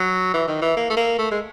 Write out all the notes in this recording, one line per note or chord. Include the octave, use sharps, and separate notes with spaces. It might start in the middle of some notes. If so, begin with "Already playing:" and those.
Already playing: F#3
E3
D#3
E3
A#3
A3
A#3
A3
G#3